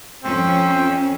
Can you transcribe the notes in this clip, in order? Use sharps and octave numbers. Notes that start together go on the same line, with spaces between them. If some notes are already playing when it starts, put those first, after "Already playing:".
F2 C4 C#4